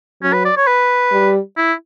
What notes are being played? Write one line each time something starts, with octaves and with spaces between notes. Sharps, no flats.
F#3 C#4
B4
D5
C#5
B4
G3
E4